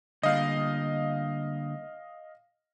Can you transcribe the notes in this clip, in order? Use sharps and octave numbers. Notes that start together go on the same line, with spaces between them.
D3 G3 A#3 D#5 F5